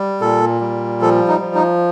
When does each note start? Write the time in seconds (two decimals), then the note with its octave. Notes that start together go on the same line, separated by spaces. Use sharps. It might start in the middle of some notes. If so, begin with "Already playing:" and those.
Already playing: G3
0.21 A#2 A4
0.61 G3
1.01 F3 A4
1.28 D#4
1.41 F3
1.55 D#4